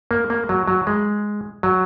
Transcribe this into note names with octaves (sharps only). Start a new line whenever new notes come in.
A#3
A#3
F#3
F#3
G#3
F#3